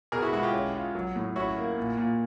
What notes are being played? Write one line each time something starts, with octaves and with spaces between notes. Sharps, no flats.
B2 G#4 A#4
E4 F#4
G#3 E4 F#4
F4 G4
C#4
F4
F#3
A2
C#4 E4 F#4
A#3
A#2
A#2